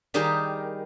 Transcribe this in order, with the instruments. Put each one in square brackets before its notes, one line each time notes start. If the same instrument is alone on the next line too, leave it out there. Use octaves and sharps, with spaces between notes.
[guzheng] D#3 G3 D#4 G4 G#4 A#4